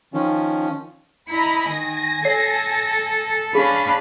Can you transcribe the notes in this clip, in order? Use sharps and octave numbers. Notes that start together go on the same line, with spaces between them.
D#3 F3 C#4
E4 D#5 A#5 B5
D#3 G#5 A#6
A4 C#5 C7
C#4 D4 G#4 F5 B5